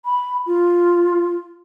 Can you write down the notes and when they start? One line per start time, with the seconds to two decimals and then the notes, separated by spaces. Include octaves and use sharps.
0.05 B5
0.46 F4